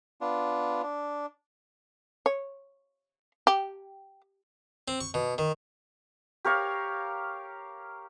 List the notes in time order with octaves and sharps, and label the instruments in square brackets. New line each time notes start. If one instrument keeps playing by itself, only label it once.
[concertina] B3 D4 F4
D4
[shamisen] C#5
G4
[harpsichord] C4
C#6
B2
D#3
[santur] G4 A#4 C#5 F5